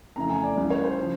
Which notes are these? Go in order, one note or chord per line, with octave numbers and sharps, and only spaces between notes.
F2 C#3 E3 A3 A#5
G#5
D5
C#2 C#3 E3 G3
C#5
C5
C#3 F3